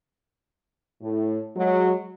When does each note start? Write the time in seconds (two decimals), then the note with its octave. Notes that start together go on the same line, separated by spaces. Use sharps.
1.02 A2
1.57 F#3 G#3